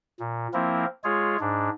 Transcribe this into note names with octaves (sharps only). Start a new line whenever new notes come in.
A#2
F3 A#3 C4 E4 A#4
G#3 F4 G#4 C#5
G#2 D4